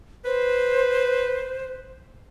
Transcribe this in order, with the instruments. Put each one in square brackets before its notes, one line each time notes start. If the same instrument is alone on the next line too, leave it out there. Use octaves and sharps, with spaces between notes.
[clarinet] B4 [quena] C5